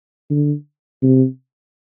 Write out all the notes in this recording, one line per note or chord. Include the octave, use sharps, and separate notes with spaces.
D3
C3